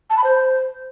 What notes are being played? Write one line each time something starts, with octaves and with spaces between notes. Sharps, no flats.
A5
B5
C5